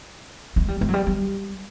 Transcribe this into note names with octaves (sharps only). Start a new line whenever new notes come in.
G#3
G3
G#3
F#3
G3
G3